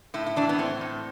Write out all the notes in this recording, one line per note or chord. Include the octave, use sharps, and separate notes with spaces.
A2 E4
E4
E3 D4
B3
A2 C4
A2